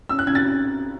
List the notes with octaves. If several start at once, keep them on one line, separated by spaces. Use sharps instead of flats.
C#4 E6
F#6
C#3 G#6
A6